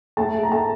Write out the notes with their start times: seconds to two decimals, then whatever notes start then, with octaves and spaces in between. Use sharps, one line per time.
0.17 A3 A5
0.34 A3
0.43 A#5
0.52 A3 A5